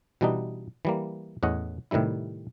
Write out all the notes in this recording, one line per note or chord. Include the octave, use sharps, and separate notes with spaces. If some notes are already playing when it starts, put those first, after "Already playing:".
B2 E3 G3 D4 D#4
E3 G3 A#3
E2 A2 C#4 D#5 F#5
A2 C3 D#3 G3 E4